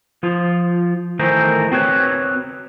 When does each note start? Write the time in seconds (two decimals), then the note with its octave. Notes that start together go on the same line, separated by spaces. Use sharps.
0.23 F3 F4
1.19 D#3 E3 A3 A#4 C5
1.72 C4 F#4 B4 C#5